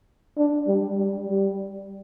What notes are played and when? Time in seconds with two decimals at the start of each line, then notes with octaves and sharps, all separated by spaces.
0.37 D4
0.68 G3
0.98 G3
1.29 G3